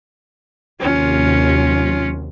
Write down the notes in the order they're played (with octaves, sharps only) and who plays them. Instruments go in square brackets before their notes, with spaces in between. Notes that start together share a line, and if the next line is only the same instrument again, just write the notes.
[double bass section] D#2 C3 F#3 [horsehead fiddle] C#4 F4